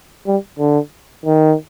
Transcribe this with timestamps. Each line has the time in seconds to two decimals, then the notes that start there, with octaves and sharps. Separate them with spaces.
0.27 G3
0.59 D3
1.25 D#3